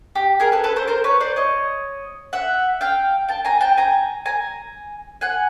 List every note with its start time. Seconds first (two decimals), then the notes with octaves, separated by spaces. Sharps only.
0.15 G4
0.40 G#4 A#4
0.52 A4 B4
0.64 A4 B4
0.76 A#4 C5
0.88 A#4 C5
1.04 B4 C#5
1.20 C5 D5
1.36 C#5 D#5
2.33 E5 F#5
2.81 F5 G5
3.29 G5 A5
3.45 G#5 A#5
3.61 G5 A5
3.77 G#5 A#5
4.26 G#5 A#5
5.21 F#5 G#5